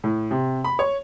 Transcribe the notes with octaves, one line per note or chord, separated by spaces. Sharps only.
A2
C3
B5
C#5